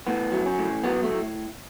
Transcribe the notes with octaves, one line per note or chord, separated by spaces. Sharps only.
A2 B3
F#3
C#4
A2
F#3 B3
A3
A2